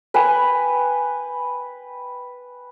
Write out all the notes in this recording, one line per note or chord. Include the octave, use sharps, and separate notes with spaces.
B4 G5 G#5